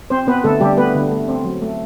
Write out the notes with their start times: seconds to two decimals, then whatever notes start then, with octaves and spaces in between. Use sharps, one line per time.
0.10 C4 C5
0.27 B3 C4 B4
0.44 D3 A3 A4
0.60 D3 G3 G4
0.77 A3 B3 B4
0.95 D3
1.11 A3
1.28 C4
1.45 F#3
1.62 A3